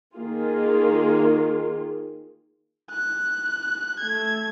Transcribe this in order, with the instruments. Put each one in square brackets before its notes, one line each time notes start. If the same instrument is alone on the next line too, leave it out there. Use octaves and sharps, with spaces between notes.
[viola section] D#3 A#3 F4 G#4
[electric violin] F#6
A3 G#6